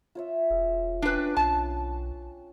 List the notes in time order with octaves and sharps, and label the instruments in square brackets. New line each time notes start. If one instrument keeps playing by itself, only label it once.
[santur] F4 C#5 E5
[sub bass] E1 [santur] G#4
[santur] C#4 G5 G#5 [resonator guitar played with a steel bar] D4 B4
[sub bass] B1 [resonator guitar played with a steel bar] A5